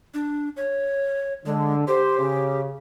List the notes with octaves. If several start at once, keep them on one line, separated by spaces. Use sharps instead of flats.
D4
C#5
D3 G#3
G4 C5
C#3